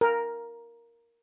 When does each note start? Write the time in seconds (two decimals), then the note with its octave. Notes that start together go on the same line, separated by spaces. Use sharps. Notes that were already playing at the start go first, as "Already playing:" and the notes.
0.01 A#4